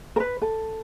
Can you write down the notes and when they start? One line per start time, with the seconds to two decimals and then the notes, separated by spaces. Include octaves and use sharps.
0.16 A#4
0.20 B4
0.42 A4